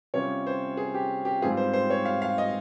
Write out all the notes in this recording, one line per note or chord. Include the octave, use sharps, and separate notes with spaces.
C3 G3 C#4 F4 C#5
C5
G#4
G4
G4
G#2 G3 C4 F4 G#4
C5
C5
C#5
F5
F5
D#5